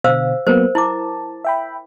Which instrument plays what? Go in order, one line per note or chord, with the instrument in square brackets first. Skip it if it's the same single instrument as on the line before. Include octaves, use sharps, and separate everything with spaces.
[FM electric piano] B2 D3 [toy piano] C5 F5 E6
[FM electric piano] F#3 A#3 B3 [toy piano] A#4 C5
[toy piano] E4 D6 [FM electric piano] A5
[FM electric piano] E5 G5 B5